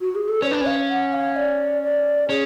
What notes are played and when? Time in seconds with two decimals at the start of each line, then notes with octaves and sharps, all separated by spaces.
0.01 F#4
0.15 G#4
0.28 A4
0.42 C#4 D5
0.47 D4 B4
0.61 C#4 F5
0.90 F#5
1.13 F5
1.36 D5
1.83 D5
2.29 C#4 G#4